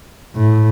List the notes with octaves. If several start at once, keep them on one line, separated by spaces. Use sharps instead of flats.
A2